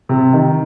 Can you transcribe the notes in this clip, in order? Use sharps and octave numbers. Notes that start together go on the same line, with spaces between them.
C3
D#3